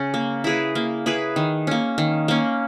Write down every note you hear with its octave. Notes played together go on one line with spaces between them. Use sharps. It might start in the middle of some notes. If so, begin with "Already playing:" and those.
Already playing: C#3 C#4
A#3
E4 G#4 B4
A#3
E4 G#4 B4
D#3
A#3 C#4
D#3
A#3 C#4